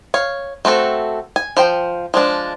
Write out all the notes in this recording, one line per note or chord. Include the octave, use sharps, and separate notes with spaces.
C#5 F5
A3 C4 F#4 A4
G#5
F3 C5 G5
F3 G#3 D4